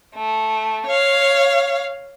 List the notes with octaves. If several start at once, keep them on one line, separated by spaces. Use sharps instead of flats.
A3
C#5 F5